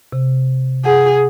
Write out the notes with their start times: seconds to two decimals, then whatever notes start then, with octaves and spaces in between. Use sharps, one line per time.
0.13 C3
0.85 G#4 F#5